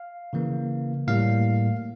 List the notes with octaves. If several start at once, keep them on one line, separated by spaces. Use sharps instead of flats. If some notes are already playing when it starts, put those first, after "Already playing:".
Already playing: F5
C#3 E3 A#3
A2 G3 A#3 F5